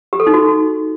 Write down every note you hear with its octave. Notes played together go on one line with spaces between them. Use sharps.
G4
A4
D#4
F#4